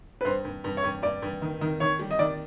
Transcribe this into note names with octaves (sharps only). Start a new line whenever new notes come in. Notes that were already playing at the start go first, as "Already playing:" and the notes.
B4
G2 C5
G2
G2
C#5
G2
G2 D5
G2
D#3
D#3
D#3 C#5
G3
D#5
D#3 D5